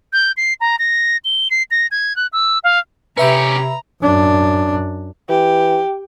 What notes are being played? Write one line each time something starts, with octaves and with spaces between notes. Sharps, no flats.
G6
C7
A#5
A#6
G7
C7
A#6
G#6
F#6
E6
F5
C3 C#4 G4 B4 E5 A#5 B5
F#2 D4
E3 G4